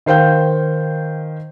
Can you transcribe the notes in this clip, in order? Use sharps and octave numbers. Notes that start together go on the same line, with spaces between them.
D#3 C5 F5 G5 G6